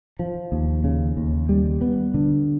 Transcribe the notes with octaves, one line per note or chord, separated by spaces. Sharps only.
F3
D#2
C#3
D#2
G3
B3
D3